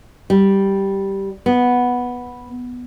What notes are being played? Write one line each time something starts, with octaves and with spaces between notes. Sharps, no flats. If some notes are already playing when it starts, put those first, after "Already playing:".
G3
B3